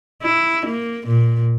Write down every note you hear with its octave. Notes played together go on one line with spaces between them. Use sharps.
E4
A#3
A#2